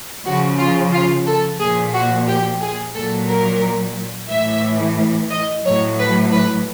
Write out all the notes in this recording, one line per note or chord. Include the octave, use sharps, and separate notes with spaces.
C#3 F3 F#4
F4
F4
A4
A#2 F3 G#4
F#4
G4
G#4
A#2 F#3 A4
A#4
A2 E3 E5
D#5
A2 F#3 C#5
B4
B4